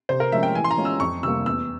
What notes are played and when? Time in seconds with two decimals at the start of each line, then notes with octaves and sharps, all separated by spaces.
0.09 C3 C5
0.20 A#4
0.32 F3 G#3 C#4 E5
0.43 G5
0.55 E3 G#5
0.64 C6
0.71 A#5
0.77 G#3 C#4 F4
0.85 E6
1.00 F2 C#6
1.23 C3 G3 A#3 E6
1.46 E2 E6